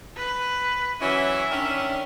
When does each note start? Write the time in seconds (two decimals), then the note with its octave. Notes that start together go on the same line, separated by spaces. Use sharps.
0.16 B4
1.01 E3 F#3 C#4 E5
1.51 D#3 C#4 D4